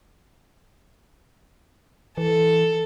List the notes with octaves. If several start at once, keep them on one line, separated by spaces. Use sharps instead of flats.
E3 A4